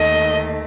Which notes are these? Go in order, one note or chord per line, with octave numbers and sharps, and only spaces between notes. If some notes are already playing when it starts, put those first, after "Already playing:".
Already playing: D#2 D#3 A3 D#5